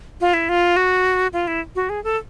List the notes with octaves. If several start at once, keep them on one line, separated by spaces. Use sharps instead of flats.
F4
E4
F4
F#4
F4
E4
F#4
G#4
A4